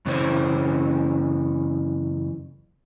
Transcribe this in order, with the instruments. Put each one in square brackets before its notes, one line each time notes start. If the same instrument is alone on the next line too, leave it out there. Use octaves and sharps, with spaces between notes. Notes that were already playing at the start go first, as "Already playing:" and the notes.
[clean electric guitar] F#2 C#3 E3 D4 C5 C#5